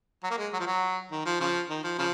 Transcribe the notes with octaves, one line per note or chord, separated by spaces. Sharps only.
F#3
A#3
G#3
F#3
F3
F#3
D#3
F3
C#3 F3
D#3
F3
C#3 F3